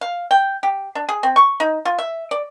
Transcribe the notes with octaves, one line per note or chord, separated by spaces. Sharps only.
F5
G5
G4
D4
G#4
C4
C#6
D#4
F4
E5
D5